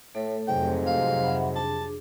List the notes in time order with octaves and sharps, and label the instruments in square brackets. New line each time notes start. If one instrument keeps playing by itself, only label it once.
[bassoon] A2 [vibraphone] A3 A4 C#5
[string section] F2 C3 F#3 [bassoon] G#2 [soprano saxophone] G5
[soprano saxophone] F5
[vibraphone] E5 F#5 B5
[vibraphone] D4 G#4 [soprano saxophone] A5